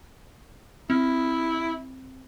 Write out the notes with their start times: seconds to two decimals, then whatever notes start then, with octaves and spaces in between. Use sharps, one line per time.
0.90 C4 E4